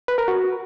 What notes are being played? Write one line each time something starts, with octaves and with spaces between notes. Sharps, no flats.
B4
A#4
F#4